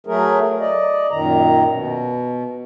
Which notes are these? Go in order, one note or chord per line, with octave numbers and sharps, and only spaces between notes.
F#3 A3 G#4 A#4
D5 D#5
F#2 A#2 D#3 A#5
B2